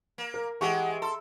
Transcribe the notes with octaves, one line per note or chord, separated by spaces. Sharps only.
A#3
A#4
E3 G#3 G4 F#5 C#6
A4 C6